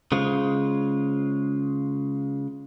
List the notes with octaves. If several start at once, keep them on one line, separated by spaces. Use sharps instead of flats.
C#3 G#3 F4 C5